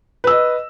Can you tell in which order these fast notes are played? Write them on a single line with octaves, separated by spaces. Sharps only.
B4 E6 D#5